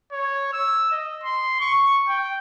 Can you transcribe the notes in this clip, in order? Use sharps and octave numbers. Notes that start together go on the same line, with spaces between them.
C#5
E6
D#5
C6
C#6
G5